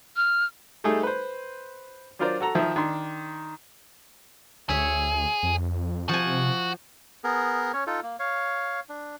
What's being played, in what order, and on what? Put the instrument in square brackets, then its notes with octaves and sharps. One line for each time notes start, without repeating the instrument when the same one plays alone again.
[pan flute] F6
[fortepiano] G3 A3 D#4 G#4 A4
B4 C5
F#3 D4 F4 A#4 C5 D5
F#4 A4 A#5
D#3 F3 E5
D#3 D4 C6
[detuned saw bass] D2 [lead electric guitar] G#4 [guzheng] C#5 E5
[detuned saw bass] F2
[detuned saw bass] C3 [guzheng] F3 G#5 [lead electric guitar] F#4
[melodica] B3 G#4 A#4
C#4 C#5
D#4 F4 A4
A#3
C#5 F5
D4